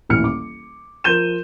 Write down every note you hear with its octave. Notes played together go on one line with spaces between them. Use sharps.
D#1 A1 E3 F6 C#7
D6
F3 A#4 C6 G6 D#7 E7